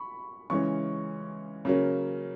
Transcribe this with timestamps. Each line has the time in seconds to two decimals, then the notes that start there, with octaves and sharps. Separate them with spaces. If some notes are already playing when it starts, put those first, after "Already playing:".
Already playing: B5 C#6
0.50 C#3 E3 G#3 C#4 C#6
1.65 C#3 F#3 A#3 C#4